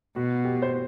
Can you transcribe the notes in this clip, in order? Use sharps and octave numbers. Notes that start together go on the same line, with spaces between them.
B2 F#4
G4
C5